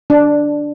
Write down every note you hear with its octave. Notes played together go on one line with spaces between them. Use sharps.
D4